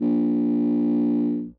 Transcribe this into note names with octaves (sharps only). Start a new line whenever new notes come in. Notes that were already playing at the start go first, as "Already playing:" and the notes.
A#1